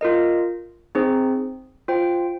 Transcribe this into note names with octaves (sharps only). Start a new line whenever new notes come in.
F4 A#4 D#5
C4 D#4 G#4 C5
F4 C5 G5